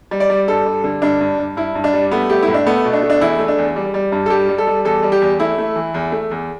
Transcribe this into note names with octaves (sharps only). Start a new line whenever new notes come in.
G3
D5
G3
G2 A4
G3
D3
G2 D4
G2
G2
G2 E4
G2
D4
G3
A3 B3
A3 G4
E4
A2
D4
A3 B3
B2
D4
A3
D4
E2 E4
A3
D4
E2
G3
G3
G2
A4
G3 G4
G3
A4
G3
E2 A4
G3
G4
E2
A3 E4
A3
E3
E2
A3
E2